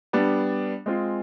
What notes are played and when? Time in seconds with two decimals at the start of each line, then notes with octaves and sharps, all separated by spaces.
0.13 G3 B3 D4
0.86 G#3 C4 F4 G#4